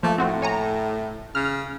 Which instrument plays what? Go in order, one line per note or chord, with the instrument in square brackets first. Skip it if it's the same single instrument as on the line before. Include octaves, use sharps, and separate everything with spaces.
[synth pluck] F3 A#3 [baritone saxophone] A3
[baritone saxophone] A2 [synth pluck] C4 F#4 C5
[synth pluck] C#5 G#5 A#5
[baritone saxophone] C#3 [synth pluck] F6